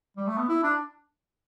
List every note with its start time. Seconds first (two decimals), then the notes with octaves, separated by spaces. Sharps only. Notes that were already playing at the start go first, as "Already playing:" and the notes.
0.17 G3
0.27 A3
0.37 B3
0.48 E4
0.63 D4